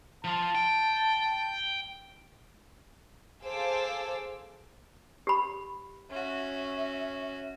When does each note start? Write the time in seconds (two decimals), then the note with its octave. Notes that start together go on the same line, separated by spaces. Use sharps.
0.24 F3 F4 A5
0.55 G5
3.44 G#4 A4 C5 F5 D6 E6
5.27 G4 B5
6.10 C#4 F#4 E5